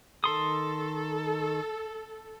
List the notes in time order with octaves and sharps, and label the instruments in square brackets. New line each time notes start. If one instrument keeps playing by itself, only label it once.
[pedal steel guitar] D#3 C6 D#6 [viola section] A4